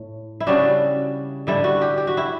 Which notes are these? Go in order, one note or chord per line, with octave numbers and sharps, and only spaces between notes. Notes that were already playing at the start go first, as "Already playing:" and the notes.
Already playing: A2
E4
C#3 G3 D4 F#4
D3 G3 D4 E4
F#4
G4
G4
F#4
E4